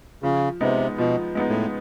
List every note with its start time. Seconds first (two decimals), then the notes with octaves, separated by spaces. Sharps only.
0.23 C#3 F3
0.61 C3 G#3 B3 D#4
0.98 B2 F3
1.35 G#3 B3 D#4
1.49 A2